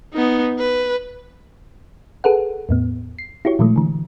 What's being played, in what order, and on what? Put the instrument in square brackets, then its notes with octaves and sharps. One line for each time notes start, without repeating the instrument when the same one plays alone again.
[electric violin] B3 D#4
B4
[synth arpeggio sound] G#4 A4 B4 F#5
E2 A2 B3
C7
E4 F#4 G4 C#5
A#2 D#3 F3 G#3 A3
D3 E3